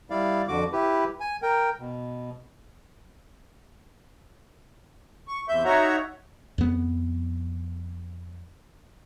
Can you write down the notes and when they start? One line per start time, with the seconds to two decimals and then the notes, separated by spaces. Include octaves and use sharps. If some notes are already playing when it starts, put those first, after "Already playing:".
0.10 G3 E4 D5 F5
0.48 F2 D3 F#4 D6
0.72 E4 G4 B4
1.20 G#5
1.42 A#4 G5
1.79 B2
5.28 C#6
5.48 E2 C3 E5 G6
5.65 D#4 F#4 C#5 E5 F#5 A#5
6.58 F2 B3